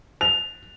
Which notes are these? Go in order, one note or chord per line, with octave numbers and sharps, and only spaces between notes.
F7